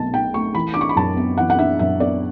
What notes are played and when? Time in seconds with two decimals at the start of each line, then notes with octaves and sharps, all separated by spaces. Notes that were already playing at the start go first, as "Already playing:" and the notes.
Already playing: B1 B2 A3 A5
0.14 B1 G5
0.34 A3 C#6
0.55 E3 B5
0.74 D6
0.76 D4 C#6
0.89 B5
0.96 F#2 A5
1.17 B3
1.37 E3 F#5
1.50 F#5
1.59 D4 E5
1.79 F#2 E5
2.00 B3 D5